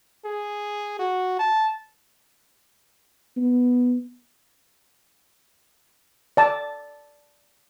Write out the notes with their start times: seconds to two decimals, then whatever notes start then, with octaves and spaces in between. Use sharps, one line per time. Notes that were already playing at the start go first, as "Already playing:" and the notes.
0.24 G#4
0.99 F#4
1.39 A5
3.37 B3
6.37 D5 A5